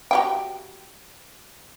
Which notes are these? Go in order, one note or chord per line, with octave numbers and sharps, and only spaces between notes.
F#4 G4 G5